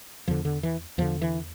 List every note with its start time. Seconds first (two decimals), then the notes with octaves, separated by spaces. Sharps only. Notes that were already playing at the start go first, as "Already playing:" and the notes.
0.28 E2 D3 F3
0.45 D3
0.63 E3
0.98 E2 D3 F3
1.22 E3